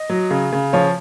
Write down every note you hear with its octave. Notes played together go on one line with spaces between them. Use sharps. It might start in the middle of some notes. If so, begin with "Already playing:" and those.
Already playing: D#5
F#3
C#3
C#3
F3 C#5